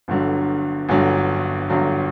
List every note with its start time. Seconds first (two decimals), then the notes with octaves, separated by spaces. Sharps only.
0.08 G1 G2 D3 F#3
0.89 G1 G2 D3 F#3
1.69 G1 G2 D3 F#3